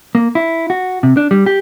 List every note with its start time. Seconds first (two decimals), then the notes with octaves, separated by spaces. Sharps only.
0.15 A#3
0.35 E4
0.70 F#4
1.03 C3
1.17 D4
1.31 G3
1.46 G4